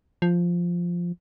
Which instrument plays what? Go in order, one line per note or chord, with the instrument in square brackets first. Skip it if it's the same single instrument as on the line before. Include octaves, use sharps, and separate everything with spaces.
[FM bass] F3